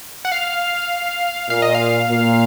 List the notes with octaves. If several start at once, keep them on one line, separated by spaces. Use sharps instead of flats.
F#5
F5
A#2 F5
D#5
F5
A#2